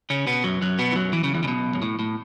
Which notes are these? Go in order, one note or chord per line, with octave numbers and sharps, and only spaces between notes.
C#3 C#4
B2 B3
F#2 F#3
F#2 F#3
B2 B3
E3
F#2 F#3
E3
C#3
E2 E3
C#3
B1 B2
F#2
A2
A2